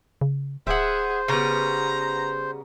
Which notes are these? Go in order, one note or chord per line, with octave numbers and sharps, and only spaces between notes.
C#3
D1 G#4 C5 E5 F#5
C#3 G3 B3 A#5